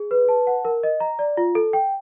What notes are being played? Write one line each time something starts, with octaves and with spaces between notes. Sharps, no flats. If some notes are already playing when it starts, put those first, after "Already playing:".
Already playing: G#4
B4
A5
F#5
A#4
D#5
A#5
D5
F4
A4
G5